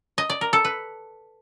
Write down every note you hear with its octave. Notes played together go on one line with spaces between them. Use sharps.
D#5
D5
A#4
A4
B4